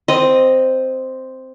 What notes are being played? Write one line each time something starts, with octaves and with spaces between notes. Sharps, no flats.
C4 D#5